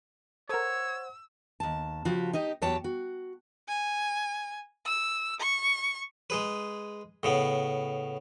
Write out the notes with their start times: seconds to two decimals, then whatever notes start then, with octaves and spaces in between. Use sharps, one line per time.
0.49 A4 A#4 C5 C#5 F#5 E6
1.60 D#2 A5
2.05 C#3 F3 F#4 G4
2.33 D#4 G4 D#5
2.62 E2 F#3 G4 C#5 A5
2.84 F#4
3.68 G#5
4.86 E6
5.40 C#6
6.30 G#3 G#4 B4
7.23 A2 C#3 B3